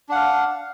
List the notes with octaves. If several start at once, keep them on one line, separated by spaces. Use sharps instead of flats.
D4 F5 F#5